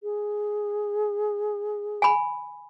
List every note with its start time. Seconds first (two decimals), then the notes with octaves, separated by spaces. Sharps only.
0.03 G#4
2.02 G#5 B5